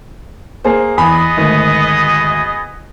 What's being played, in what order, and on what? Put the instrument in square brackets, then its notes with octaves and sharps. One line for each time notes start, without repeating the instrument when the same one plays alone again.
[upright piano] A#3 G#4 C5
[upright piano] E2 G#5 B5 [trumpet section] B3 G#4 D#5
[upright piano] G#1 D2